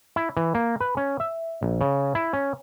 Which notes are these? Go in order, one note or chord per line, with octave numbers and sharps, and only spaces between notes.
E4
E3
A#3
B4
C#4
E5
A#1
C#3
E4
C#4